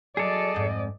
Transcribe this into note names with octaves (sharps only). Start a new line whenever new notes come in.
F#3 G#4 A4 D5 D#5 A5
F2 G#2